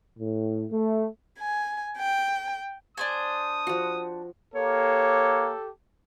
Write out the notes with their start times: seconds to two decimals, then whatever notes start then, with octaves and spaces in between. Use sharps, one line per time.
0.19 A2
0.71 A3
1.38 G#5
1.97 G5
2.97 D4 C5 G#5 D#6
3.67 F3 F#4
4.55 A#3 G4 A4 C#5